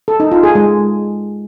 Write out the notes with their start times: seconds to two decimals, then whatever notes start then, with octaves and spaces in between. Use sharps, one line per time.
0.08 A4
0.20 D#4
0.32 F4
0.43 G#4
0.55 G#3